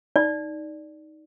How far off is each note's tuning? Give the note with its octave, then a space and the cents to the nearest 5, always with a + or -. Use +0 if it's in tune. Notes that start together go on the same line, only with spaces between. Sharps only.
D#4 +5 D5 +0